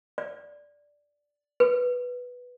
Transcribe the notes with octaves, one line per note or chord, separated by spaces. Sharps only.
D5
B4